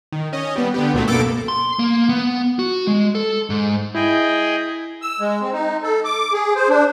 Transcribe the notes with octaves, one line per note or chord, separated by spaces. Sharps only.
D#3
C#4 D#5
G3 B3
D3 B3 G4
C#2 A#2 F#3 A3
F#2 B2 A#3 A4 D6
C6
A#3
B3
F#4
G#3
A4
G#2
E4 G#4 D#5 G5
E6
G#3
C4
D#4
A4
D6
G#4
C5
D4